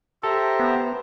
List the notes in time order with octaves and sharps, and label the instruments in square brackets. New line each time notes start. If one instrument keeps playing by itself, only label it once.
[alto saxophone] G4 [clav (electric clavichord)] A4 [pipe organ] C5 E5 A#5
[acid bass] B3